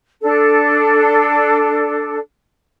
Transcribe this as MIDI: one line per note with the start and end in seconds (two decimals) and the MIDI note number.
0.21 2.17 62
0.21 2.17 69